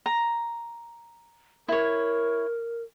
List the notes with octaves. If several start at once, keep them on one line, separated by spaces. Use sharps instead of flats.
A#5
E4 A#4 C#5